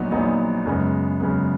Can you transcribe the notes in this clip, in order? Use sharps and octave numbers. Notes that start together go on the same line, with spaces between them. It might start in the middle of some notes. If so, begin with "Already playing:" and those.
Already playing: A#1 A#2 F#3 B3 D#4
A#1 A#2 F#3 B3 D#4
F#2 C#3 G#3 B3
F#2 C#3 G#3 B3